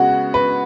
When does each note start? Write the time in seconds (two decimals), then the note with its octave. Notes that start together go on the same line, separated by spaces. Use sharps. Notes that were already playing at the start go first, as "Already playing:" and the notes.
Already playing: C#3 G#3 B3 F#4
0.34 B4